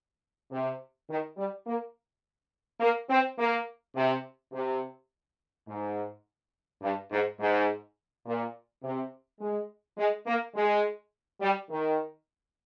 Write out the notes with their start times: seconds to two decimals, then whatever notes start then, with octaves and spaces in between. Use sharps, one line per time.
0.51 C3
1.08 D#3
1.37 G3
1.65 A#3
2.80 A#3
3.09 C4
3.37 A#3
3.95 C3
4.52 C3
5.67 G#2
6.82 G2
7.10 G#2
7.39 G#2
8.25 A#2
8.83 C3
9.40 G#3
9.97 G#3
10.26 A#3
10.55 G#3
11.41 G3
11.70 D#3